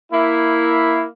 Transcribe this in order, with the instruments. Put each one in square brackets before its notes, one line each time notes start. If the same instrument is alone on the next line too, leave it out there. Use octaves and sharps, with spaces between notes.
[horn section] A#3 E4